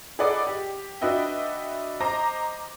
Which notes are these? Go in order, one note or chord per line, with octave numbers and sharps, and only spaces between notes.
G#4 A4 B4 D5 D#5 F#5
G4
D4 F#4 B4 D#5 E5 G5
C5 D#5 A#5 D6 A#6